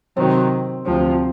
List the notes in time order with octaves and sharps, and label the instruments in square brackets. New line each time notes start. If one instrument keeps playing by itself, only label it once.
[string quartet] C3 D#3 F#3 [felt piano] C4
[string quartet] D2 C3 F3 [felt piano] C4